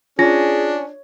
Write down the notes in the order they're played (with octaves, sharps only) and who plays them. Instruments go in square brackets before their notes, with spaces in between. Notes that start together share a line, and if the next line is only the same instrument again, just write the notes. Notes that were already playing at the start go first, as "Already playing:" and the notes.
[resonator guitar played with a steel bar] C#4 [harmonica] D4 [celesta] F4 A#6 [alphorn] G#4